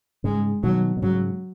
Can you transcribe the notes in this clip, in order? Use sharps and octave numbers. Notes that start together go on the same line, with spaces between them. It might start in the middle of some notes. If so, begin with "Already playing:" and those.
G#2 C#3 G#3
B2 D#3 F#3
B2
G#2 C#3 F#3